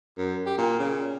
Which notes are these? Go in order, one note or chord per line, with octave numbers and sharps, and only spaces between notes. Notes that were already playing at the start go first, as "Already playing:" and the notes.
F#2
G4
A#2
C#3